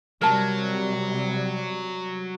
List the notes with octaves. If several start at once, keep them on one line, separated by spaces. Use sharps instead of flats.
C3 F#3 G3 A#4 A5